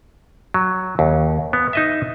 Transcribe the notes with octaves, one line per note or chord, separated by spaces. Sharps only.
F#3
D#2
B3
D#4 D#5 E5